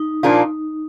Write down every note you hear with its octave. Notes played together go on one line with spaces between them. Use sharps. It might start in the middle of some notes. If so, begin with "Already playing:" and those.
Already playing: D#4
A#2 F3 A#3 D4 F4